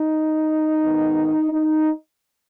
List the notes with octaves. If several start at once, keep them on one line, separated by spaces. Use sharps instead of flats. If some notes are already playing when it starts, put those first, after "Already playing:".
Already playing: D#4
G#2 D#3 B3
D#4